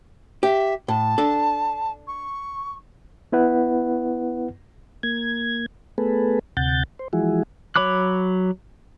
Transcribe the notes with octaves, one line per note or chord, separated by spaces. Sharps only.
G4 E5
A2 A5
D4 A4
C#6
B3 E4 B4 F#5
A#3 G#6
A3 B3 G#4 A4 B4
D2 C3 F#5 G6 A6
C5
E3 F3 G#3 E4 F#4 G#4
F#3 C#5 B5 D6 F#6